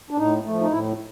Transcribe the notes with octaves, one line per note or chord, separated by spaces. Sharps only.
D4
A2 D#4
F3 A3
D#4
A2 E4